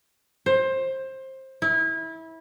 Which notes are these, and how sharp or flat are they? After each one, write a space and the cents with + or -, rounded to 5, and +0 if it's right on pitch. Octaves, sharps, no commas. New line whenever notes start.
C5 +20
E4 -20